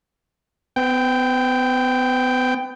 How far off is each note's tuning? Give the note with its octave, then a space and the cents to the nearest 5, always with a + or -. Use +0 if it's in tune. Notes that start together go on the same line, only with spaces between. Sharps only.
B3 +35 G5 +0